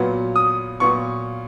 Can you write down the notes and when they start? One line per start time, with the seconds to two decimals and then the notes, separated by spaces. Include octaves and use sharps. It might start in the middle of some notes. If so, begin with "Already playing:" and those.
Already playing: A#2 F#3 B3 F4
0.36 D#6
0.80 A#2 F#3 B3 F4 C#6